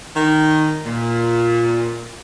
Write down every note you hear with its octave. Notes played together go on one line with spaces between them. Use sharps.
D#3
A#2